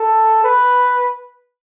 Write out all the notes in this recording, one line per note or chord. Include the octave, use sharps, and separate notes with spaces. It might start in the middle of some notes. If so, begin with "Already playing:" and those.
Already playing: A4
B4